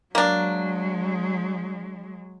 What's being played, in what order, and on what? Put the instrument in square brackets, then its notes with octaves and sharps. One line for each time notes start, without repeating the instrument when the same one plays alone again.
[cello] F#3 G#3 [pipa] A#3 D4